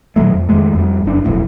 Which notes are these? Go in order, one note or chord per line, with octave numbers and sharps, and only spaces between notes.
A#2 D#3 F#3 A3
F2
F2 D#3 G#3 A3
F2 G3
F#1 F#2 D4
E1 B1 F2 A2